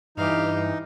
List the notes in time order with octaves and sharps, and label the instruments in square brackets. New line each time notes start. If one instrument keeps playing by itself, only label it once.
[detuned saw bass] G2 [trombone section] E3 [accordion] D#4 [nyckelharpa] G4 F5